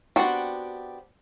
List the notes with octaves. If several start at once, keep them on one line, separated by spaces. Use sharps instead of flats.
B3 C4 D4 F#4 G4